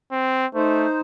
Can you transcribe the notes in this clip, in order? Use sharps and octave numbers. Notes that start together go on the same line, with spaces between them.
C4
A3 D#4 C5